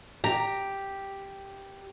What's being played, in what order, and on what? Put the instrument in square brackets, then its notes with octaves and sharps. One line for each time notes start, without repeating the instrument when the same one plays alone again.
[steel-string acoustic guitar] G4 [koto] A#5